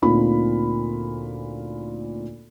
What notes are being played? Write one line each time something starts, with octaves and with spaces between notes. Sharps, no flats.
D2 A#2 C4 D#4 F4 B5